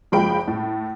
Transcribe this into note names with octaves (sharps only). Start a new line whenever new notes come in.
F#1 F3 G#3 G5 B5 D7
A2